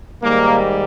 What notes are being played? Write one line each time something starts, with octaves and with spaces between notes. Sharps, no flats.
G#2 D#3 G3 A#3